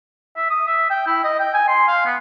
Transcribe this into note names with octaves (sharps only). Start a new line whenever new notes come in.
E5
D#6
E5
G5
E4
D#5
G5
G#5
C6
F5
B3